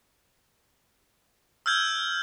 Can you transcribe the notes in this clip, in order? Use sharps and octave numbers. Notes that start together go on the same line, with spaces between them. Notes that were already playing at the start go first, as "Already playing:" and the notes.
E6 F6 G6 G#6